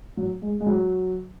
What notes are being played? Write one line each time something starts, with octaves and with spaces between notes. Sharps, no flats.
F#3
G#3
G#3
F#3